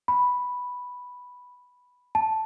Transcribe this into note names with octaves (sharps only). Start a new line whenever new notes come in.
B5
A5